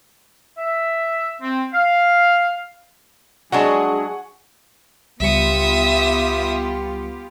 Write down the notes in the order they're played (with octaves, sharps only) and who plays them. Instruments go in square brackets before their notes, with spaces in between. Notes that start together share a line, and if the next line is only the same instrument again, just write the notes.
[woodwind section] E5
C4
F5
[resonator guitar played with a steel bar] F#3 G#3 D4 [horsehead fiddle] G#4 [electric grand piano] F#5 G#5 C#6
[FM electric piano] C#2 G3 C#7 [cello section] B3 F4 G4 [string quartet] E5 D#6